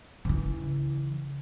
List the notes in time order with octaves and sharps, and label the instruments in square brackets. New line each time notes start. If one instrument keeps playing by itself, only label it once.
[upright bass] C#3 E3